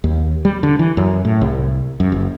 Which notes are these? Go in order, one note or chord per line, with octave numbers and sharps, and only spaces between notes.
D#2
G3
D3
E3
F#2
A2
C2
F#2
F#1